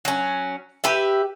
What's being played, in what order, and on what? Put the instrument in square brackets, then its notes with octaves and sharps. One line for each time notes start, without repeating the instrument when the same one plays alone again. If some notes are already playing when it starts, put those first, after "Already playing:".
[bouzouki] F#3 C#4
G4 B4 E5